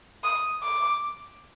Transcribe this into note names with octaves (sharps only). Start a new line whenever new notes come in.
D#6
D6